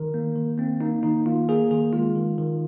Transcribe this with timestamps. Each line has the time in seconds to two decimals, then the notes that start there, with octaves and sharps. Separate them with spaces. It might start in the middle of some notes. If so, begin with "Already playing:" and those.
Already playing: D#3 A#4
0.14 A#3
0.36 D#3
0.58 A#3 C4
0.81 A#3 D#4
1.03 D#3 D#4
1.26 A#3 F4
1.49 A#3 G#4
1.71 D#3 G#4
1.93 G#3 F4
2.16 D#3
2.38 D#3